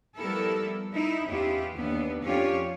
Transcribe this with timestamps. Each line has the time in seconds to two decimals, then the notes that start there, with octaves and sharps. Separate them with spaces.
0.16 F3 G3 B3 E4 A4 A#4
0.94 D#4 E4
1.27 E2 B3 C#4 E4 F4 G4
1.75 D#2 B3 D4
2.24 F2 C#4 D4 F4 G4 C#5